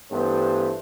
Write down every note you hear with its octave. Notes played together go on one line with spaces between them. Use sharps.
G2 E3 G3 A3 B3 C5